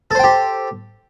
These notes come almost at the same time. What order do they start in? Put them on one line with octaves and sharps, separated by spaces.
A4 C5 G5 G4